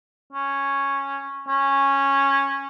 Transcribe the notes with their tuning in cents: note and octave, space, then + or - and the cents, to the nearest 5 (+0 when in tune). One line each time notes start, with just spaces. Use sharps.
C#4 -5
C#4 -10